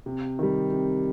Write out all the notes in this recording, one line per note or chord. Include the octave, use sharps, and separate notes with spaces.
C3
D#3 G3
C3